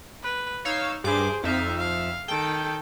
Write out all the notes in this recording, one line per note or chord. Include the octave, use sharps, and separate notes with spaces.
B4
D#4 C#5 F5 E6
G2 G#4 C5 D6
F2 D#4 E5 F5
F5
D#3 A4 G5